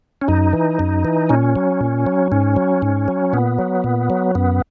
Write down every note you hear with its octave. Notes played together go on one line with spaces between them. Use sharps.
C#4
F#2 D#4
E3
F#2
E3
A#2 C#4
F#3
A#2
F#3
G#2 C#4
F#3
G#2
F#3
A#2 B3
F#3
A#2
F#3
F#2 B3